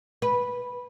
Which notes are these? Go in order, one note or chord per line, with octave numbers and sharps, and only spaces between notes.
B4